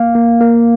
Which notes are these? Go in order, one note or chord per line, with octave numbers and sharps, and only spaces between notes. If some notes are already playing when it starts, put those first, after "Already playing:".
Already playing: A#3 F5
A#3
A#3